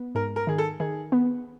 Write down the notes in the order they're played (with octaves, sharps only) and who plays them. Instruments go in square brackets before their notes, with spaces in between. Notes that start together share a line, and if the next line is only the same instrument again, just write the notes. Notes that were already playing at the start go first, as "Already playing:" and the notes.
Already playing: [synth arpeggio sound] B3
[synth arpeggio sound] G#2 [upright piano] A#4
[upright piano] A#4
[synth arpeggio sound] D#3 [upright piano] G#4
[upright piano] A4
[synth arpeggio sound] D#3 [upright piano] G#4
[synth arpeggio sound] B3